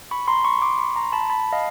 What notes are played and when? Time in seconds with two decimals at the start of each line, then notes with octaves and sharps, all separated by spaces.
0.11 B5 C#6
0.28 A#5 C6
0.44 B5 C#6
0.62 C6 D6
0.78 B5 C#6
0.96 A#5 C6
1.12 A5 B5
1.30 A5 B5
1.52 D#5 F5